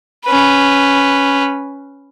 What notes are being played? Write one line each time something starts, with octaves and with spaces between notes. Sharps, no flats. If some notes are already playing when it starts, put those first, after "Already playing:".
C#4 B4